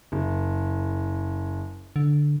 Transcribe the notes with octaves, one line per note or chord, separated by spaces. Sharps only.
F#1
D3